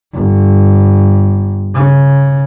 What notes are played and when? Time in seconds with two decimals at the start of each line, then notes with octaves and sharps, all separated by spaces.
0.14 G1
1.75 C#3